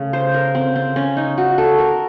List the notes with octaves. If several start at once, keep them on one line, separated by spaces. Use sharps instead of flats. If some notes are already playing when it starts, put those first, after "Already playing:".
Already playing: C#3 A3
C5
A#4
C4
C4
C#4
D#4
F#4
A4
A#4